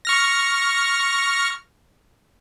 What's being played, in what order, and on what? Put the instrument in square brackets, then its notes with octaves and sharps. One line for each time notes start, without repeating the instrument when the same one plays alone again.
[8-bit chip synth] C#6 F6 A#6